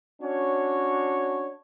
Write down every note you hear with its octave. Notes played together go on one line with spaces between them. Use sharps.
C#4 D4 F#4 C#5